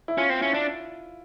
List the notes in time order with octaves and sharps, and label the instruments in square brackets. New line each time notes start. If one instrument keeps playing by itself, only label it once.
[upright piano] E4
[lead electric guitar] C#4 [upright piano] F4
[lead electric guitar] C4
[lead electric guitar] C#4 [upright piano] E4
[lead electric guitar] D4